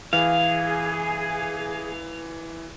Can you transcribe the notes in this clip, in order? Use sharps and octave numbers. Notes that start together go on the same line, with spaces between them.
E3 G#4 F5